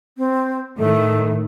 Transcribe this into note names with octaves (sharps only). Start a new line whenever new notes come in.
C4
A2 D#3 A3